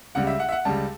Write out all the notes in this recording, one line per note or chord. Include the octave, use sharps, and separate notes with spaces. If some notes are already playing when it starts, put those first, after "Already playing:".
C#2 C#3 G3 F#5
E5
F#5
E5
F#5
C#2 C#3 G3 A5